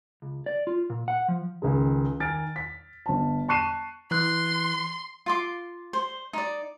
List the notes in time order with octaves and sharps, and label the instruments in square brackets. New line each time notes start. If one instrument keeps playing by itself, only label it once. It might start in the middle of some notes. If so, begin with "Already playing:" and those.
[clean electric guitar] C#2
D5
F4
A#2
F#5
F3
[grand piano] C#2 D#3 G#3
D#3 G#5 F6 A6 D7
B6
G1 A5
A5 C#6 F#6 C7 D#7 E7
[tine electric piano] E3 F#6 [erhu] C6
[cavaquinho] F4 C6 D6
C5
D#4 D5